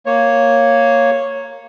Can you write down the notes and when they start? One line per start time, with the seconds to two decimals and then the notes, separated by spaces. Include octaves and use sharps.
0.06 A#3 C#5